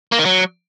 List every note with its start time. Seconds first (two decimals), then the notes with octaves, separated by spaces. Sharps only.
0.12 A#3
0.19 D#3
0.25 F#3